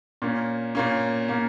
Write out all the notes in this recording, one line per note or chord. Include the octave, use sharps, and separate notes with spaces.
A#2 A#3 C#4
A#2 A#3 C#4
A#2 A#3 C#4